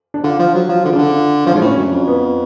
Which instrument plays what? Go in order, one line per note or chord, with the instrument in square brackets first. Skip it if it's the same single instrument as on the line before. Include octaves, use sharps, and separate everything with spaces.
[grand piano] D4
[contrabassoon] D3 [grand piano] F4
[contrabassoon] F3
F#3
F3
[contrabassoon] D3 [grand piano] F4
[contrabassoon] C#3
[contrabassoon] D3 [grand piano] D4
[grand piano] F4
[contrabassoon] F3 [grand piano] C#4
[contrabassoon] G#2 [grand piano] D4
[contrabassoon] A2 [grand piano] C#4
[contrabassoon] F#2
F2
[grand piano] B3